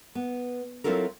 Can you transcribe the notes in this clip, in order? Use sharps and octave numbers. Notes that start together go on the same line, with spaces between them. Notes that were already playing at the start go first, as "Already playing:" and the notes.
B3
F#3 C4 E4 F4 A4 A#4